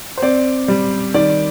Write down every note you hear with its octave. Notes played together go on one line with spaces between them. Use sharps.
C5
C4 D5
G3
D#3 D5